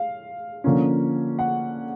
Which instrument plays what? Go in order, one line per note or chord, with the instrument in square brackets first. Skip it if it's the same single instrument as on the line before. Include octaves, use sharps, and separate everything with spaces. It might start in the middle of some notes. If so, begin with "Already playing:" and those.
Already playing: [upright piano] F5
D3 F3 A#3 C#4
F#5